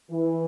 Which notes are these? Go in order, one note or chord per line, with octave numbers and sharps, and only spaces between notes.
E3